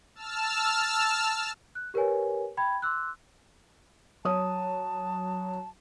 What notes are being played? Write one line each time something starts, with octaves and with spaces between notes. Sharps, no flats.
A5 E6 F6
F#6
G4 A#4 B4 C#5 G#5
G5 B5 G#6
C6 D6 E6 F#6
F#3 C#5 A5 D#6